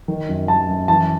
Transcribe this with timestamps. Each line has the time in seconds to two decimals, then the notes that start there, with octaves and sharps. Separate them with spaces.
0.08 D#3
0.29 F#2
0.48 D#3 A5
0.68 F#2
0.88 E3 A5